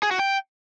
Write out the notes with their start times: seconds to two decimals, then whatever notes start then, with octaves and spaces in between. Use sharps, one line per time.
0.03 G#4
0.11 F#4
0.19 G5